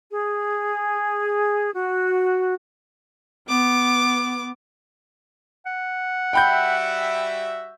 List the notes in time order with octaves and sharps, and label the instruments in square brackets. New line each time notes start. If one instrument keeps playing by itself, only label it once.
[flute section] G#4
F#4
[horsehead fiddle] B3 [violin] D6
[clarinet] F#5
[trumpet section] G3 F#4 E5 [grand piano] G5 B5 G6